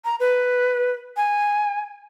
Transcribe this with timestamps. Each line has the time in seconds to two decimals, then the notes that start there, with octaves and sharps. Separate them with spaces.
0.05 A#5
0.20 B4
1.17 G#5